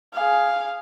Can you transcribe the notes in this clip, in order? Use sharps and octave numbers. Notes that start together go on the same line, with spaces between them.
G#4 F5